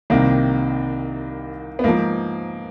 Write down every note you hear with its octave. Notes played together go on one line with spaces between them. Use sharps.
C2 C3 D#3 A#3
B3
G#2 F3 A#3